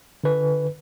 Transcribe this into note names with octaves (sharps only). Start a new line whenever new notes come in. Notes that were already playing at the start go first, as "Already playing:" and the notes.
D3 B4